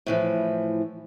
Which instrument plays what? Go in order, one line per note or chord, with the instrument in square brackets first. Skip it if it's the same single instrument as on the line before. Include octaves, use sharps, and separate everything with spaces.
[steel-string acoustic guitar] A2 E3 F3